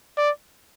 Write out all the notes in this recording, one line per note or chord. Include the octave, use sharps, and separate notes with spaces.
D5